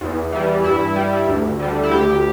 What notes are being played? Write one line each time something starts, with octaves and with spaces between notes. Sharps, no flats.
E2
E3 G3
G2 E4
G3
D2
D3 G3
E4
D2 G4